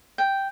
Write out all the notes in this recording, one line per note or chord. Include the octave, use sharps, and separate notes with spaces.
G5